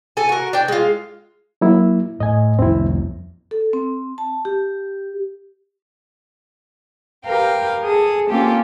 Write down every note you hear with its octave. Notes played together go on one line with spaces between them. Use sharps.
A4 G#5
F#4 A#4
D4 G5
G#3 F4
F#3 A#3 E4
A2 D#5 G#5
C2 F2 C4 E4
A4
C4
A5
G4
G4 A#4 B4 F5 G5
G#4 A4 D#6
A#3 C4 C#4 F4 G4 A4